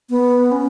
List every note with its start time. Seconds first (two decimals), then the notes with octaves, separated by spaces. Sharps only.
0.10 B3
0.52 C#4